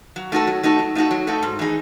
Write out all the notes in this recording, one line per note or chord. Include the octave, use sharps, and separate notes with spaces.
F#3
A3 D#4 F#4 A4
F#3
A3 D#4 F#4 A4
F#3
A3 D#4 F#4 A4
F#3
A3 D#4 F#4 A4
G#2
E3 A3 D#4 G#4